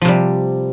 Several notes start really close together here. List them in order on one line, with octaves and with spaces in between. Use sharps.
F3 C3 G3